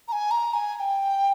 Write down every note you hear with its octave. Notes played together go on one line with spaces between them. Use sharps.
A#5
G#5
A#5
G#5
G#5
G5